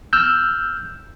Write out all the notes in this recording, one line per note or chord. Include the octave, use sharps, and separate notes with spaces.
E6 F6 G6